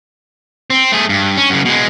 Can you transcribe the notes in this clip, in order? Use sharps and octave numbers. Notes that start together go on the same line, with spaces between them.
C4
A3 G#4
G2
C#4
F#2 C#3
B2 G#3